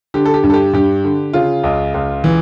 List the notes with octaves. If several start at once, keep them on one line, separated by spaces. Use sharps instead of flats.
D3 G4
A4
G4
G2
A4
G4
G2 G4
D3
C#3 F4
C#2
C#2
E3